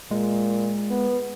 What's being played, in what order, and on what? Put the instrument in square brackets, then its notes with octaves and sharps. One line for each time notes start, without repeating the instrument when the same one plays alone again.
[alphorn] A#2 [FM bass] G#3
[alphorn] B3